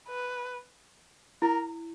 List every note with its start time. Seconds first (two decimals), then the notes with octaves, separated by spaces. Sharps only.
0.08 B4
1.42 E4 A#4